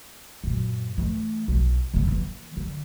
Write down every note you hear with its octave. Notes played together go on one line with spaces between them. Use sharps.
F#2 A#2
E3 A3
B1 C4
C#3 B3
E3 A#3
D3